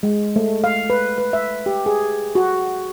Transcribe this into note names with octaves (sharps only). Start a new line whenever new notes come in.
G#3
A3
F5
B4
B4
E5
G4
G#4
F#4